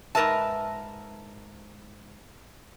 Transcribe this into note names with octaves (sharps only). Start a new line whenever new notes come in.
G#2 D#3 A#4 B4 E5 A5